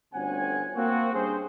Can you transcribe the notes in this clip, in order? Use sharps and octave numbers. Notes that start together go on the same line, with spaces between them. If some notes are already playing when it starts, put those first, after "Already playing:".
G1 D2 C4 C#4 F#5 G#5
A#3 C4 F#4
G2 C4 C#4 G#4 C5